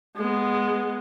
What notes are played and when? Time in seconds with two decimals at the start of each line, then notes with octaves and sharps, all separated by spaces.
0.16 G#3 B3